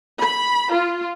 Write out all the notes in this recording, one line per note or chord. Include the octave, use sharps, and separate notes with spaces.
B5
F4